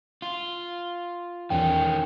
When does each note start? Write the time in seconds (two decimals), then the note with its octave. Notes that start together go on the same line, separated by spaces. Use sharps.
0.22 F4
1.50 E2 D#3 C#4 G5